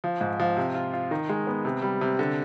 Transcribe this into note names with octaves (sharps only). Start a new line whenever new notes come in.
F3
G#2
F3
C3
F4
F4
D#3
G#3
B3
C3
G3
C3
D3